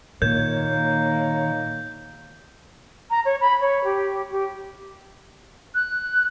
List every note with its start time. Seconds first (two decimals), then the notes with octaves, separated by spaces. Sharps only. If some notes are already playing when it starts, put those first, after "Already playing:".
0.22 A#2 D#3 A#3 D#4 C#5 G6
3.10 A#5
3.25 C#5
3.40 B5
3.61 C#5
3.84 G4
4.31 G4
5.75 F#6